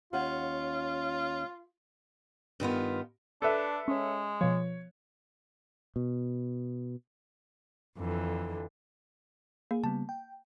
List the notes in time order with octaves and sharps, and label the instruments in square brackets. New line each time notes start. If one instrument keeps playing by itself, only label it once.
[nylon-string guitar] D#2 C#4 F#5 [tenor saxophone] F4
[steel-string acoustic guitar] G2 D#3 B3 F4
[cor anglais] D4 [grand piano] A4 B4 E5
[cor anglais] G#3 [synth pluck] C#4 C#5
[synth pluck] B2 F3 [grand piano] C#5
[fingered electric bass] B2
[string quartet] F2 D3 E3
[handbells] A#3 [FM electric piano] G#4
[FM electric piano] C#3 G3 B3 [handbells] A5
[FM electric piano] G5